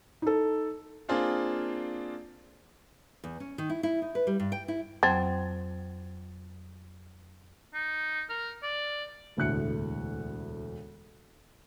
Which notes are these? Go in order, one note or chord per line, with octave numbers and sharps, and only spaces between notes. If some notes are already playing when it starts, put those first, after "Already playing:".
D#4 A4
A#3 C4 D4 F4 G#4
E2
C#4
D#3
E4
E4
D#4
B4
G3
G2
G5
E4
F2 F#3 C4
D#4
A#4
D5
E1 D2 A2 F#6 C#7